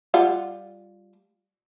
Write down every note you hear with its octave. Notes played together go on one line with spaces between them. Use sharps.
G3 F4 F#5